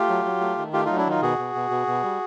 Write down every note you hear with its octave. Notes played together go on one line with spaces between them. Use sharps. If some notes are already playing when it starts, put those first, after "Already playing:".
Already playing: A3 F4 G4
F#3
F#3
A3
D#3
A3 F4 G4
F#3 D#4 F4
D4 E4
D#3 D#4 F4
B2 F#4 G#4
B2
B2
B2
B2
G3